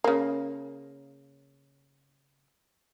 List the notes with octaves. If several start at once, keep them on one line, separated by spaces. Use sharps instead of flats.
C#3 A#3